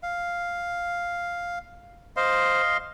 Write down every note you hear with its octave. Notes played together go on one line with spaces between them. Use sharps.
F5
C5 D#5 F5 C6